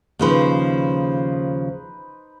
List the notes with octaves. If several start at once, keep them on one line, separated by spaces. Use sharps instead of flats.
D#2 C#3 F3 D#4 B4 C5